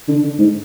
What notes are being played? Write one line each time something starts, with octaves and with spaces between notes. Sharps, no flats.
D3
D3
G#2